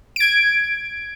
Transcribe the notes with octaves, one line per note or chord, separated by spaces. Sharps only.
G#6 D7